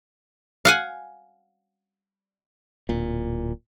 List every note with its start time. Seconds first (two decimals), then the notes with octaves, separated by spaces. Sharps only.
0.65 F5 F#5 G#5
2.89 D1 A#2